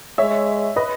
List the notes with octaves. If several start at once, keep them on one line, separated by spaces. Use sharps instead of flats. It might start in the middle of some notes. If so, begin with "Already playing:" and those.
G#3 C#5 E5
B4 D#5